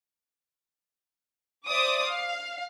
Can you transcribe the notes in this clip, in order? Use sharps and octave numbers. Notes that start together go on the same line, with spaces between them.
C5 D5 E5 D6 D#6
F5